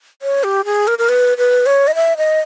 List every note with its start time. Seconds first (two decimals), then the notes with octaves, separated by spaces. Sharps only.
0.22 C#5
0.43 G4
0.65 G#4
0.87 A#4
0.98 A#4
1.09 B4
1.38 B4
1.66 C#5
1.87 D#5
1.95 E5
2.17 D#5